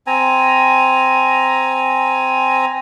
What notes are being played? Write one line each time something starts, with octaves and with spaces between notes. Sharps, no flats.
C4 G#5 A#5